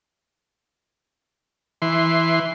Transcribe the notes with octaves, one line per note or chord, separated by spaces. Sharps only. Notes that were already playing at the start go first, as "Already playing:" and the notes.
E3 C6